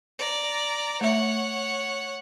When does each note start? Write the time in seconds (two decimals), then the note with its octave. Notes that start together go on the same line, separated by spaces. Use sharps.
0.19 D5 A#5
1.01 A3 C#5 E5 F#5